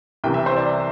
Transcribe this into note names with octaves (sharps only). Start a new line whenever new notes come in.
C2 C3 E3 G5
E5
C5
D5